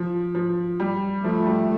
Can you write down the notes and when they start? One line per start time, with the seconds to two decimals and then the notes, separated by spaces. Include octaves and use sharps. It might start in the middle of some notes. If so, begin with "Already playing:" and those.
Already playing: F3
0.35 F3
0.80 G3
1.24 F3 A3
1.47 G3